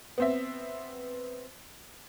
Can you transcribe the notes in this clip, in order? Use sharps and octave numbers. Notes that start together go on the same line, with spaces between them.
B3 C4 E5